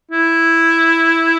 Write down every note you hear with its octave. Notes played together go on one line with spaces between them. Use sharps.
E4